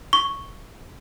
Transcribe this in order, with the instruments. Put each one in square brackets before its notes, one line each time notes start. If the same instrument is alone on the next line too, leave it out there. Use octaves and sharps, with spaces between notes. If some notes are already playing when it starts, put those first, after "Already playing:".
[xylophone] C#6